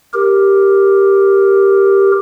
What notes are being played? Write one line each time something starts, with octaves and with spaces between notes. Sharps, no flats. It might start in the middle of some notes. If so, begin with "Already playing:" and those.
G4 A#4